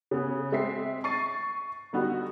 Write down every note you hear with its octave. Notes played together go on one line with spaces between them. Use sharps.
C#3 B3
G#3 C4 E5 B6 C7
C#6 A6 C7 D#7
D3 G3 B3 D#4 F#4